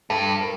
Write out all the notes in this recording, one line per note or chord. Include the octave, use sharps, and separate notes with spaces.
G2 A4
A#4